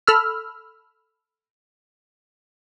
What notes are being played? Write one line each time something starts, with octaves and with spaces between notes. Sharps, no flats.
A4 B5 E6 F6